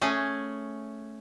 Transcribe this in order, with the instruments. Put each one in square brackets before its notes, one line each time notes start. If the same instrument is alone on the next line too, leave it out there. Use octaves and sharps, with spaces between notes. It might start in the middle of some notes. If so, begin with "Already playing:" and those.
[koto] A3 C#4 G#4